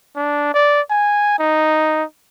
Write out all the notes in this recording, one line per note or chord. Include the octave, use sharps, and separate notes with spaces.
D4
D5
G#5
D#4